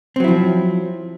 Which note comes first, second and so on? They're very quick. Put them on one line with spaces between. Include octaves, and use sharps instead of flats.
C4 F#3 E4 F3